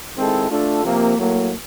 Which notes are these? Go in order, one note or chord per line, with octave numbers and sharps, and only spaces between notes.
D#3 G#3 C4 E4 A4
A3 D4 F4 A4
C3 F3 A#3
A2 F#3 A#3